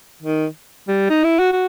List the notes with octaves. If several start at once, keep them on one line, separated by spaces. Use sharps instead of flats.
D#3
G3
D#4
E4
F#4
F#4